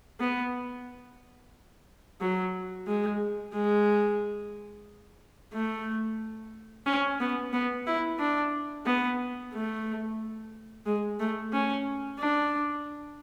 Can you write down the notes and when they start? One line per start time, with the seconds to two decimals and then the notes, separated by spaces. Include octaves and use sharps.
0.20 B3
2.21 F#3
2.87 G#3
3.53 G#3
5.53 A3
6.86 C#4
7.20 B3
7.53 B3
7.87 E4
8.19 D4
8.86 B3
9.53 A3
10.86 G#3
11.20 A3
11.53 C#4
12.19 D4